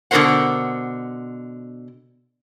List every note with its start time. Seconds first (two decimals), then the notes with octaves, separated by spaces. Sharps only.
0.11 B2 D3 F4 A#4 C5 F#5